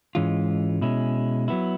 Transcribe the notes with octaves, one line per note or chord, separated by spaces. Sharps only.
G#2 E3 G#3 C#4 F4
B2 G#3 C#4 E4
F#3 B3 E4